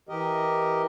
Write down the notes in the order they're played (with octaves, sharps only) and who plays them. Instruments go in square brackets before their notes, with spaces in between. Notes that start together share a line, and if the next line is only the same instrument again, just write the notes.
[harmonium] E3 G4 A#4 D#5